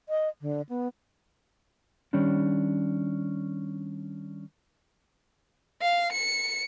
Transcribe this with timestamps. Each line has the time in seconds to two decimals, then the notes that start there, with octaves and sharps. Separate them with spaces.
0.09 D#5
0.41 D3
0.69 B3
2.13 D#3 G3 C#4 D4
5.81 F5
6.12 C#7